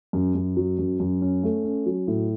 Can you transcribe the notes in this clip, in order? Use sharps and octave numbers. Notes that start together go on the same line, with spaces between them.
F#2
F#2
F#3
F#2
F#2
C#4
A3
C#4
F#3
A2